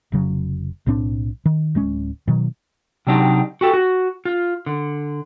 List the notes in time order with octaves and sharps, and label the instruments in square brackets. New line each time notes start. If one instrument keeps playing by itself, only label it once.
[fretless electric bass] F1 C#3 F#3
B1 A2 C4 D4
D#3
D1 G#3 C#4
B2 D#3 F#3
[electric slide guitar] C3 F#3 D4 D#4 G4
F#4 G4 A4
F#4
F4
D3